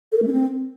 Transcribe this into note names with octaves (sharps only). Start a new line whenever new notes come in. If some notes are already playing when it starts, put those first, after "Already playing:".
A4
A#4
A3
C#4
C4